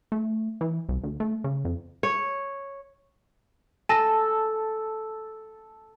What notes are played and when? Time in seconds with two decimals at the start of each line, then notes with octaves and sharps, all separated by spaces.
0.12 A3
0.61 E3
0.89 C2
1.03 D2
1.20 A3
1.44 C#3
1.65 F2
2.03 C#5
3.89 A4 G#5 A5 A#6